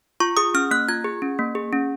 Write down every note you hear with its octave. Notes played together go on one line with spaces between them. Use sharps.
F4 C#6
G#4 D#6
C#4 F6
A#3 F#6
F4 G#6
G#4
C#4
A#3
G#4
C#4